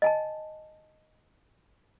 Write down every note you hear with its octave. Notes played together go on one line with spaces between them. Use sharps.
D#5 G#5 A5